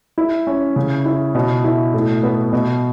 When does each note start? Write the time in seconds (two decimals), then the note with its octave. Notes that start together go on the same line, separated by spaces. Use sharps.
0.18 E4
0.47 C#4
0.76 C#3
1.05 E4
1.35 B2
1.64 E4
1.93 A2
2.23 B3
2.53 B2